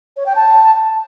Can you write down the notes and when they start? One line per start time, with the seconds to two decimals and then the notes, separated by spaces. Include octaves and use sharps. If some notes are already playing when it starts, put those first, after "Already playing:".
0.17 C#5
0.26 G5
0.36 A5